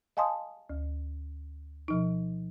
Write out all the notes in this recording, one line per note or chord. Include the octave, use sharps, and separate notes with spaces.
D#5 F5 G#5 A5 C6 D#6
D2
B2 F3 D#4